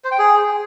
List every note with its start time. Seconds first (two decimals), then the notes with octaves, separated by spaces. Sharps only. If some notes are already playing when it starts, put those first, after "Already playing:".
0.04 C5
0.11 G5
0.19 G#4